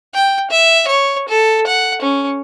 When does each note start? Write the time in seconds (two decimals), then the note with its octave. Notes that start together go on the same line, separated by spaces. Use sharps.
0.15 G5
0.51 E5
0.88 C#5
1.29 A4
1.67 F#5
2.02 C#4